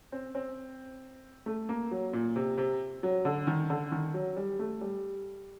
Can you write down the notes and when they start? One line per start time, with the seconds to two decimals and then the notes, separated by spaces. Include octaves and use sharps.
0.12 C4
0.35 C4
1.46 A3
1.69 A#3
1.91 F#3
2.13 A#2
2.36 C3
2.58 C3
3.03 F#3
3.25 D3
3.47 D#3
3.70 D3
3.92 D#3
4.14 F#3
4.36 G3
4.59 A3
4.81 G3